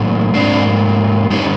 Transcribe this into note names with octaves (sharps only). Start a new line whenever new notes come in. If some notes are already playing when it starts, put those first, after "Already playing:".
Already playing: A2 F#3 A#3
G#2 F3 A#3 C4 D4
G2 D3 G3 B3 C#4 D#4